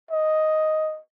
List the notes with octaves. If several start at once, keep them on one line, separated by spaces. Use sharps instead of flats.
D#5